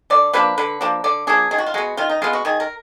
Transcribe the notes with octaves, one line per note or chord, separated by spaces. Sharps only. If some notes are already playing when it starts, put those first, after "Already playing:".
D3 D5
F3 A#3 D4 B4
D3 B4
F3 A#3 D4
D3 D5
F3 A#3 D4 G#4
D#3 G#4
F#4
F4
G#3 B3 F#4
D#3 F4
D#4
G#3 B3 F4
F#4
D#3 G#4
A#4